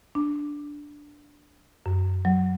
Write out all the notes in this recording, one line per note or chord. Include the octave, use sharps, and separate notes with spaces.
D4
F#2
F#3